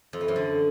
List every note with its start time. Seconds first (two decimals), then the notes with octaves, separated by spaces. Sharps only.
0.13 F2
0.21 E3
0.28 F#2
0.36 D3